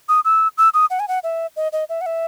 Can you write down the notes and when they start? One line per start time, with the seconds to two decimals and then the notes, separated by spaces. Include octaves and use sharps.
0.09 D#6
0.25 E6
0.58 E6
0.74 D#6
0.90 F#5
1.00 G#5
1.08 F#5
1.24 E5
1.56 D#5
1.73 D#5
1.89 E5
2.01 F#5
2.06 E5